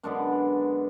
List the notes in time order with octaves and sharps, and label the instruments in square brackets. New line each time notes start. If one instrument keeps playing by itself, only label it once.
[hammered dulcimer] F#2 D3 G#3 B3 D4